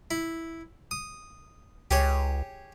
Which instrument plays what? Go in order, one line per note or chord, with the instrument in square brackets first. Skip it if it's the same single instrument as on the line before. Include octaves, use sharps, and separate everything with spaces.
[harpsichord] E4
D#6
[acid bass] C#2 [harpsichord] G4 G#4 C#5